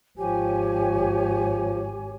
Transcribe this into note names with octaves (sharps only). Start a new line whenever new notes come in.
G#1 F3 G4 C#5 G#5